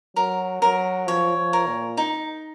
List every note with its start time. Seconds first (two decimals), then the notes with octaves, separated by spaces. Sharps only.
0.16 F#3 A#4
0.62 F#3 A#4
1.07 F3 C#5
1.37 F3
1.53 A#4
1.68 A#2
1.97 D#4